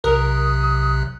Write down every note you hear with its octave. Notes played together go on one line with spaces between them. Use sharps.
B1 C3 A#4 D#6 F#6